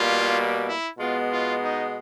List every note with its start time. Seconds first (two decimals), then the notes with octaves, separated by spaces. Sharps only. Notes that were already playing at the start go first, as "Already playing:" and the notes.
Already playing: B2 G3 A#3 F4
0.67 E4
0.99 B2 G#3 B3 F4
1.31 F4
1.63 D#4